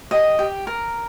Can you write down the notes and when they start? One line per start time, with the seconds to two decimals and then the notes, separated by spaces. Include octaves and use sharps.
0.11 G4 D#5
0.39 G4
0.67 A#4